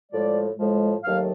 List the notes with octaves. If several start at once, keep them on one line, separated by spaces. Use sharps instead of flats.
A2 F3 G#3 D5
A2 F3 G#3
D#2 D#3 F#3 A3 F5